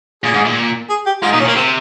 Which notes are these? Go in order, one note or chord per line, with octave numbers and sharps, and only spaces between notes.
A#2 G#4
G#2
A#2
G#4
G4
G#2 F4
D#4
A#2
C#4
A#2 A#3
C3 C4